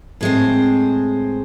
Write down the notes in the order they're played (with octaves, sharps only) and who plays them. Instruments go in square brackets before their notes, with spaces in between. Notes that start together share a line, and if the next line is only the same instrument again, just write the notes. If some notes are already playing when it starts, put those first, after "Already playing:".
[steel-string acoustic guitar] A2 G#3 C4